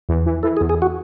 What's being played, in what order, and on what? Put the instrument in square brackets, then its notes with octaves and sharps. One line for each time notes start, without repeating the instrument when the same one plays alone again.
[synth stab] E2
E3
[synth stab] E3 [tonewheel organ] A4
[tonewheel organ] G#4
[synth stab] E2
[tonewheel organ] G#4
F#4